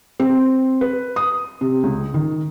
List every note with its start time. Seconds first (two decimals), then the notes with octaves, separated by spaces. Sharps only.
0.20 C4
0.81 B4
1.16 D#6
1.61 C3
1.83 C#2
2.14 D#3